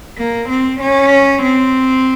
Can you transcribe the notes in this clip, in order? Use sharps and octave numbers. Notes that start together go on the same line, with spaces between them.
A#3
C4
C#4
C4